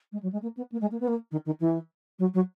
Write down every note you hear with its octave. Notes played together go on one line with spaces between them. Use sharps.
G#3
F#3
G#3
A#3
B3
A#3
G#3
A#3
B3
A#3
D#3
D#3
E3
F#3
F#3